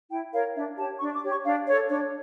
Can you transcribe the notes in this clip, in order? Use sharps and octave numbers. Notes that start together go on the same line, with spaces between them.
E4 G5
A#4 C#5 F5
D4 E5
G4 C#5 A5
D4 C#6
D6
G4 C#5
C#6
D4 F5
A4 C#5 D5
D4 C#5